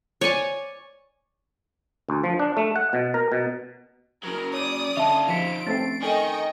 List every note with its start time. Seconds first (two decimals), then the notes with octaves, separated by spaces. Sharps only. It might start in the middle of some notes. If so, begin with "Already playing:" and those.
0.21 C#5 D5 G#5 C#6
2.09 D2
2.24 F3
2.40 D4
2.57 A3
2.76 F#5
2.93 B2
3.14 A#4
3.32 B2
4.23 C#3 F#3 A#4
4.54 C#5 D5 D6 D#6
4.97 D3 C#4 D#4 F4 E5 A5
5.29 F3 B6 C#7 D7 E7
5.66 A3 C4 C#4 A6 C7
6.02 D#3 A4 D#5 G5 G#5 C#6